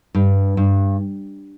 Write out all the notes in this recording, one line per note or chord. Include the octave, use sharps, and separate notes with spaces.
G2
G2